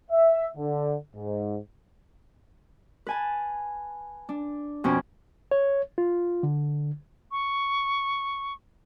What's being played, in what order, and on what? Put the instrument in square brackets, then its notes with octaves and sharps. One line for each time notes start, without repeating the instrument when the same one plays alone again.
[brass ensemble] E5
D3
G#2
[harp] B4 G#5 A5
D4
F2 B2 C#4
[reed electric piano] C#5
F4
D3
[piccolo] C#6